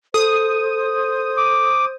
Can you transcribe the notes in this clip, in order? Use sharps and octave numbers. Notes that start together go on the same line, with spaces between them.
A4 C5 D#6
D6